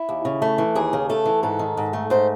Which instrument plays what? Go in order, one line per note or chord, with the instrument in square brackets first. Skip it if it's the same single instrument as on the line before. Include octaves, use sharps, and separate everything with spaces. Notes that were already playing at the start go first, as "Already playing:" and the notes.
Already playing: [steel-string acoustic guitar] E4
D#2
C#3
A3
E3
D#2 G#4
C#3
A3 A4
E3
G#2 A4
D#3
G#2
A3
G#2 C5